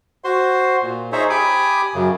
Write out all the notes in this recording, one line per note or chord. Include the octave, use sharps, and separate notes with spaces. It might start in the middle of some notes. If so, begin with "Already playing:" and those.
F#4 C5 C6
A#2
D#4 G#4 C5 C#5 E5
G4 G#5 B5 D6 D#6
F#2 C#3